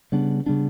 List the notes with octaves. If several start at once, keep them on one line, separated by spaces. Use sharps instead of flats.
C#3 G3 B3 D4
C#3 G3 B3 D4